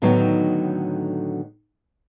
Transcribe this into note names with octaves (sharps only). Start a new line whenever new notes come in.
A2 D3 D#3 F#3 B3 D#4